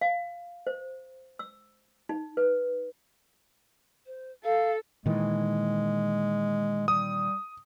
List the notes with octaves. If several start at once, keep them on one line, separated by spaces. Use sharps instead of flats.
F5
C5
E6
D#4
B4
C5
A4 F5
A#2 D#3 E3 G#3
G3 D#6